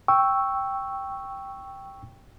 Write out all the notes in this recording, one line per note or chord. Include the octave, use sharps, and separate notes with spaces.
G5 C#6 E6